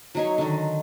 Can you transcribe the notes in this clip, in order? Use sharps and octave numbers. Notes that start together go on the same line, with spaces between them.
F#3 D#4 C#5
D3 D#3